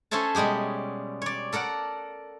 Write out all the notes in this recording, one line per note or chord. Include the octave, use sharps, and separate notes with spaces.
C#4 A4 C5 C#5 E5 A5
B2 G3 G#3 G4 G#4
C#5 D5
A4 A#4 D5 F#5